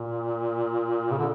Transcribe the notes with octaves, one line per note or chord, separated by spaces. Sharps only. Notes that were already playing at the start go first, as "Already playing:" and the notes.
Already playing: A#2
C#3
D3